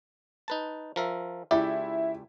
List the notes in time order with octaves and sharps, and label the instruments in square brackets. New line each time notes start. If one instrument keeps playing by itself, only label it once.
[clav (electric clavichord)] D#4 B4 A5
F3 A#4 E5
[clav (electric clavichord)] C#2 G4 D5 [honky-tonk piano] E4